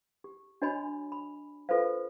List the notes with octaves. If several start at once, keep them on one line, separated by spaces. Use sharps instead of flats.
G4
D4 F#4 C#5 D#5 G#5 B5
B5
F4 A4 B4 C5 F5